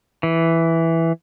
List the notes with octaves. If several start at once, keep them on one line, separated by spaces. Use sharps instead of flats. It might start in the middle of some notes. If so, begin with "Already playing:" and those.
E3